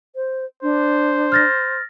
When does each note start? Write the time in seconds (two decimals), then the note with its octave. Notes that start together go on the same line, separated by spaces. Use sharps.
0.16 C5
0.63 D4 C5
1.32 F6 A6 A#6